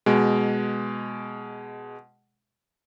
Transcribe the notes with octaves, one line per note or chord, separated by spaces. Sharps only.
B2 G#3